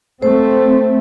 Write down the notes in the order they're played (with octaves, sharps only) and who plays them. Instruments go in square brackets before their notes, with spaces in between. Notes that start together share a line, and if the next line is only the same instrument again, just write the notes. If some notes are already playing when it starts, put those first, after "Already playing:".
[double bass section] A3 C4 [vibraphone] C5